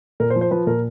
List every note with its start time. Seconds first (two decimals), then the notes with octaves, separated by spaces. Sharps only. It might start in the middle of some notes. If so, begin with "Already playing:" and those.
0.20 A#2 A#4
0.30 C5
0.36 F3
0.41 C5
0.51 F3 B4
0.67 A#2 A#4